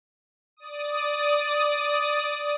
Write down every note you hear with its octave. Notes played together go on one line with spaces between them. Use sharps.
D5 D#6